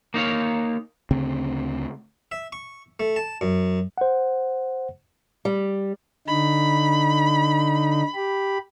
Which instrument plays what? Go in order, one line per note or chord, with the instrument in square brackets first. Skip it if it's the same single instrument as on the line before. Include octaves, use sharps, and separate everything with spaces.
[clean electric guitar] A#3 D#4 C#5 F5
[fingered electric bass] D2 C#3 C4
[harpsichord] E5
C#6
A3
A5
F#2
[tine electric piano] C5 F#5
[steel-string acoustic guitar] G3
[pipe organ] D3 D#4 [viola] B5
[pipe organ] G4 B5